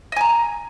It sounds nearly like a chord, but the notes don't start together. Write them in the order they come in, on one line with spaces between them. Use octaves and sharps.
D#5 G#5 A#5